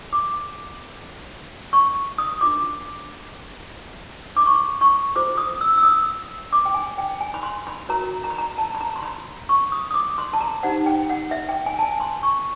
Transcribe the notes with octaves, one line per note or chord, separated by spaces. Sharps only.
D6
C#6
D#6
D4 F4 A#4 D6
D6
C#6
C#6
F4 A4 C5 D6
D#6
E6
E6
D#6
D6
G5
G#5
G5
G#5
B5
C6
B5
F#4 A#4 C#5 A#5
A#5
B5
A#5
A5
B5
A#5
C6
B5
C#6
D#6
D#6
D6
C6
A5
A#5
D#4 G4 C5 F#5
G5
F#5
E5
G5
G#5
A5
G#5
C6
C#6